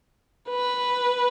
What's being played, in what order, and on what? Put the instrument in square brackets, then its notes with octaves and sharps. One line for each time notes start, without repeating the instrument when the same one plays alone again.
[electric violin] B4